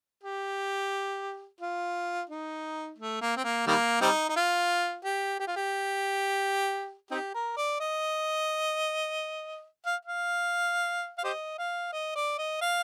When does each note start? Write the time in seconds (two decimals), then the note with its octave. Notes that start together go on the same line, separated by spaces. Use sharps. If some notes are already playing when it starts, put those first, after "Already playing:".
0.23 G4
1.61 F4
2.30 D#4
2.98 A3
3.22 A#3
3.37 C4
3.44 A#3
3.67 D#3 G3 A#3
4.02 G3 C4 D#4
4.29 D#4
4.36 F4
5.05 G4
5.39 G4
5.47 F4
5.56 G4
7.11 C4 D#4 G4
7.35 A#4
7.57 D5
7.80 D#5
9.86 F5
10.05 F5
11.18 F5
11.24 G4 C5 D#5
11.59 F5
11.92 D#5
12.16 D5
12.38 D#5
12.61 F5